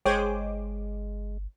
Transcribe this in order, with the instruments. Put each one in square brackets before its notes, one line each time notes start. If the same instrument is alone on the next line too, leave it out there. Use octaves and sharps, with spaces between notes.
[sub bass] G1 [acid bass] G#3 [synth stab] G#4 C5 D6 [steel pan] C#5 G5